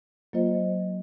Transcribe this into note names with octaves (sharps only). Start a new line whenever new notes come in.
F#3 A#3 F4 C5 D#5